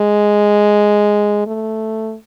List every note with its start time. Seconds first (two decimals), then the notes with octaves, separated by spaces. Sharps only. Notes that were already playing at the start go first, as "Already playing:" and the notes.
Already playing: G#3
1.47 A3